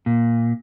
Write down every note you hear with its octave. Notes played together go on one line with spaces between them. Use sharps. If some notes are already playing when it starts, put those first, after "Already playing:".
A#2